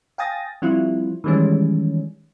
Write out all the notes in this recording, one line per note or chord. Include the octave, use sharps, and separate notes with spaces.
F5 G5 G#5 D#6 A6 A#6
F3 G3 C4 E4 F4
D#3 E3 G3 G#3 C#4